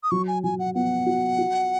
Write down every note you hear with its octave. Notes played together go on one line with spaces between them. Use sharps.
D#6
F#3 C#6
G#5
F#3 G#5
F#5
B3 F#5
F#4
F#4